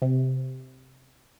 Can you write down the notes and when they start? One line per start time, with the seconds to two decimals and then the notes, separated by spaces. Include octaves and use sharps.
0.02 C3